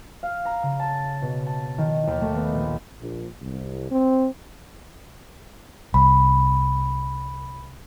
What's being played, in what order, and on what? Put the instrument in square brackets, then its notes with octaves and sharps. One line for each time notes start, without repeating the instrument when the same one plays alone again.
[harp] F5
A#5
C#3
A5
B2
A5
D#3
D#2
A3
B3
A#1
[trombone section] A#1
C2
C4
[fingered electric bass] C2 [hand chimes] B5